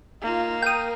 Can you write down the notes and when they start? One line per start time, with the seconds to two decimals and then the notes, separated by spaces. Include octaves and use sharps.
0.21 A#3 D#4 F4
0.62 A#4 G5 D#6